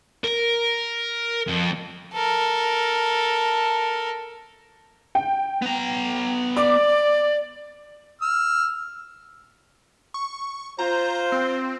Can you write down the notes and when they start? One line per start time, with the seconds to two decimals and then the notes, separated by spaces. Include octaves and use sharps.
0.24 A#4
1.48 F2
2.14 A4 A#4
5.15 G5
5.62 B3 A#5
6.57 D5 D6
8.22 E6 F6
10.14 C#6
10.79 F4 C5 A#5
11.32 C4